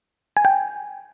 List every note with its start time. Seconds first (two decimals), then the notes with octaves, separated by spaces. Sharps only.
0.37 G#5
0.45 G5